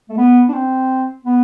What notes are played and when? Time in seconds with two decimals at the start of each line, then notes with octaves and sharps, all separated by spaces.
0.09 A3
0.18 B3
0.49 D4
0.53 C4
1.25 B3